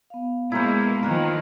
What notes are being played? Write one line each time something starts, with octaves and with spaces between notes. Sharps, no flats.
B3 F5
B2 G#3 A#3 E4 A#4 C5
D#3 F3 A#4 B4 G#5